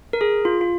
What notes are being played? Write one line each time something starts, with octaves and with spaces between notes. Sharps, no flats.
A#4
G#4
F4
F4